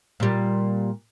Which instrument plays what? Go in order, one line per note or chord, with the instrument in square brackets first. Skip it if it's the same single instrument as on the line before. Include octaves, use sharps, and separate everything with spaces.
[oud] A#2 G3